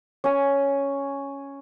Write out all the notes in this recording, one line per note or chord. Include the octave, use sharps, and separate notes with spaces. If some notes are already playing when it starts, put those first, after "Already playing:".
C#4 G#5